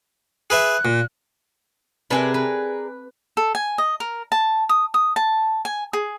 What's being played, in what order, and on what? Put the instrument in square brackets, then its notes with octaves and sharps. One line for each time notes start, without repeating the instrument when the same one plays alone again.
[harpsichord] G#4 B4 E5 [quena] F#6
[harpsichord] A#2
[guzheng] C3 B4 A5 [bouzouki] D4 G#4 A#4
[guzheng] B4
[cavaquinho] A4
G#5
D#5
A#4
A5
D#6
D#6
A5
G#5
G#4